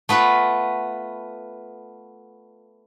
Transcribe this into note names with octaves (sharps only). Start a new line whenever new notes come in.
A3 B3 F4 B4 F5